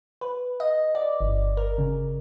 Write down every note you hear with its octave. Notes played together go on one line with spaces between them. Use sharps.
B4
D#5
D5
G1
A#4
C#3